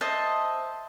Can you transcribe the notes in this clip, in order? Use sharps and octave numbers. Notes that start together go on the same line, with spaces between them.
C5 D#5 E5 A5